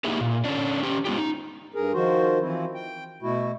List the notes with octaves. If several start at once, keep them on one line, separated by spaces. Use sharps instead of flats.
A#3 D#4 E4 G4 G#4
A#2
D3 C#4 D4
C#4 G4
G#3 B3 F4 G4
D#4
G2 G#4 A#4
D#3 F3 F#4 C5
E3 F3 C4 E4
G5
B2 A3 E4 F#4